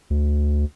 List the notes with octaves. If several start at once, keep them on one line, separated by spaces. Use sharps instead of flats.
D2